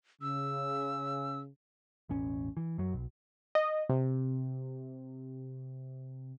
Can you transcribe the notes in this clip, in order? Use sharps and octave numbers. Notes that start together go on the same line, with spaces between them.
C#3 E6
E1 A1 C#4
E3
F#2 F#3
B1
D#5
C3